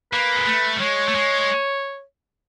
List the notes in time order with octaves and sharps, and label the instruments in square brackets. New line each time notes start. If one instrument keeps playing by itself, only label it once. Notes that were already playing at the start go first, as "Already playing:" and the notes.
[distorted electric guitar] A#3 [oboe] B4
[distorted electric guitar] G#3
A3
G3
[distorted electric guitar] G#3 [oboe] C#5
[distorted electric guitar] A3
G#3